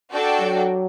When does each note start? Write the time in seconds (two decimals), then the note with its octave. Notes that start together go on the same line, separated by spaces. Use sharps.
0.12 D4 F#4 A4 D5 G5
0.41 F#3